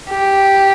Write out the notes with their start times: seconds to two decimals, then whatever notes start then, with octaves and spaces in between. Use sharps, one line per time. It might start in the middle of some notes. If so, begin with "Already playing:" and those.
0.11 G4